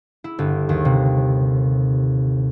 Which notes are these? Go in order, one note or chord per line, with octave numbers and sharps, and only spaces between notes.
E4
G1
D#2
C3